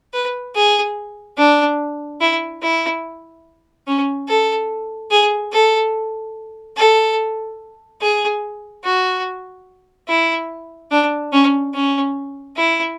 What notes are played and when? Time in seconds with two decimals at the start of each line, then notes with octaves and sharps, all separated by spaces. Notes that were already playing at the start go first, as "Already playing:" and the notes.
0.13 B4
0.55 G#4
1.38 D4
2.21 E4
2.62 E4
3.87 C#4
4.28 A4
5.11 G#4
5.52 A4
6.77 A4
8.01 G#4
8.84 F#4
10.08 E4
10.91 D4
11.33 C#4
11.74 C#4
12.56 E4